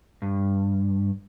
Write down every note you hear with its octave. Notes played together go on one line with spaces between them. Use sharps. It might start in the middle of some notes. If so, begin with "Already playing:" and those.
G2